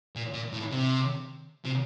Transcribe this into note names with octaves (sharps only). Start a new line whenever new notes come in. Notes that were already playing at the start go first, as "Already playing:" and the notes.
A#2
A#2
A2
C3
C3